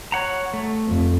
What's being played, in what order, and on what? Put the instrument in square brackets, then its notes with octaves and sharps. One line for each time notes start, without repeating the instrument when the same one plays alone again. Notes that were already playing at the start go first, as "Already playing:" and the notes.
[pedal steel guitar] C#5 F#5 A#5
A3
[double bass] F2